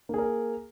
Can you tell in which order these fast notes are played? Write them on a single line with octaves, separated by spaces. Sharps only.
A#3 G#4 A#4